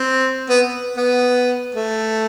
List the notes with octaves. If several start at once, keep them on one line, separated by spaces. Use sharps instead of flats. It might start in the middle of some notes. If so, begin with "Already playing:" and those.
Already playing: C4
B3
B3
A3